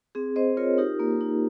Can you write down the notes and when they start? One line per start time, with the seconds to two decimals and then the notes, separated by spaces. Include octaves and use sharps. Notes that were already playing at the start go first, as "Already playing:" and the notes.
0.15 C4 G#4
0.36 C4 C5 D#5
0.57 F4 A#4 C#5
0.78 D#4 G4 A#4
0.99 A#3
1.21 D#4